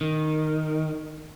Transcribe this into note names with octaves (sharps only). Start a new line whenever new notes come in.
D#3